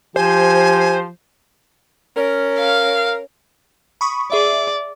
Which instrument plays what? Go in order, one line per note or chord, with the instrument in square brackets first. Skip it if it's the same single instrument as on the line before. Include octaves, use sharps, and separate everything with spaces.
[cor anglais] F3 [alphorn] G4 [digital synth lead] C5 [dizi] G#5
[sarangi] C#4 [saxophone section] A#4
[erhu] F5
[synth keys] B5 C#6 D#6
[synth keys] G#4 E5 [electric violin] D5